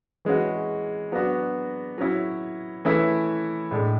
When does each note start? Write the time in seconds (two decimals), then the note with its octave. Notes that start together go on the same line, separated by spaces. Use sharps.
0.25 E3 G#3 C#4 F#4
1.12 F#3 B3 D4 F#4
1.98 F#3 C#4 E4
2.85 E3 A3 C#4 E4
3.71 A2 G#3 D4